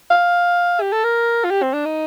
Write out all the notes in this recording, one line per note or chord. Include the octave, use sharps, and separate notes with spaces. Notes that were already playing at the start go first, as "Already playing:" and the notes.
F5
G4
A4
A#4
F4
G4
C4
D4
D#4